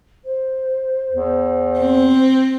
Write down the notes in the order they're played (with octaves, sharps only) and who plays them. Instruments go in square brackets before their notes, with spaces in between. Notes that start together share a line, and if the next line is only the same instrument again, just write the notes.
[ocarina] C5
[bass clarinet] E2
[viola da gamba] C4